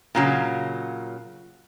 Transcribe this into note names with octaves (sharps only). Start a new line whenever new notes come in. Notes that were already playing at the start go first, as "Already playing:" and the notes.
A#2 C#3 F#3